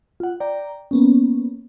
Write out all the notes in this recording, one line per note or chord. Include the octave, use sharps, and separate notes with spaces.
F4 F#5
D5 G5 A#5
A#3 B3 C#4